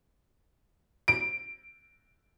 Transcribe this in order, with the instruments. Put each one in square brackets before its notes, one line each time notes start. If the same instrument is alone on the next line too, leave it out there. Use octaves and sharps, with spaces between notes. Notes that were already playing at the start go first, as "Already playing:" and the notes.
[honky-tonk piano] D7